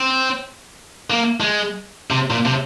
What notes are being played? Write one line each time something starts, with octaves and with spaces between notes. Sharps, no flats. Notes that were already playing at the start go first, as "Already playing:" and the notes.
Already playing: C4
A#3
G#3
C3
A#2
C3